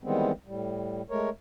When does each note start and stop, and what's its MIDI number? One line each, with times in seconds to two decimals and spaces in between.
0.04 0.32 51
0.04 0.32 52
0.04 0.32 55
0.04 0.32 56
0.04 0.32 59
0.04 0.32 60
0.47 1.02 45
0.47 1.02 55
1.10 1.30 56
1.10 1.30 57
1.10 1.30 70
1.10 1.30 73